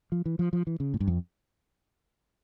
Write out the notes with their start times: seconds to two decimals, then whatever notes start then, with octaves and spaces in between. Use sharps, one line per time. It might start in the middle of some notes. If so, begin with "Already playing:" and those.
0.12 F3
0.26 E3
0.39 F3
0.53 F3
0.67 E3
0.80 C#3
0.94 A2
1.00 G2
1.08 F2